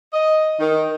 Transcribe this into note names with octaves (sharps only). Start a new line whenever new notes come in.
D#5
D#3